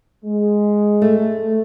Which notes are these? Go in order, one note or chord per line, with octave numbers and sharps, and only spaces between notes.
G#3
A3